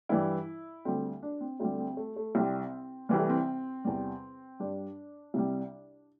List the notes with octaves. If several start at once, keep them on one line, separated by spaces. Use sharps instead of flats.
G2 E3 G3 E4
D2 D3 G3 C4
D4
C4
D2 D3 G3 C4
C4
A3
A3
C2 C3 G3 C4
C2 C3 E3 G3 C4
A3
C4
E2 C3 G3
G2 G3 D4
C2 C3 G3